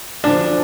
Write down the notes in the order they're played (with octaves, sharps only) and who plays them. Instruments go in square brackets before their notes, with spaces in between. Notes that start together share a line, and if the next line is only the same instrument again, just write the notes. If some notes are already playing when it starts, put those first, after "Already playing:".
[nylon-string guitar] F#2 D3 F3 [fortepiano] D4